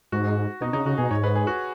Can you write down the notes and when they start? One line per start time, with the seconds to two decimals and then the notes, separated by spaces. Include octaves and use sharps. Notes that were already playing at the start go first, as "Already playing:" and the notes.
0.12 G#2 F#4
0.61 B2 D#4
0.73 C#3 D#4
0.85 C#3 F#4
0.98 B2 G#4
1.11 G#2 C#5
1.24 B4
1.35 G#4
1.47 F#4